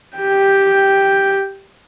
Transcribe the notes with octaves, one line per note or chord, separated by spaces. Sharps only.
G4 G5